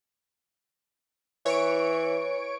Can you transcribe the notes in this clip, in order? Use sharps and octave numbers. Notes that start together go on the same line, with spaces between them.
E3 C#5 C#6 D7